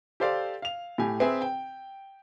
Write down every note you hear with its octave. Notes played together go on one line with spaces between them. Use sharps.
G4 A4 C5 D5 F5
F5 F7
A2 G4 G#5
C4 G#4 B4 E5 G#5 B5
G5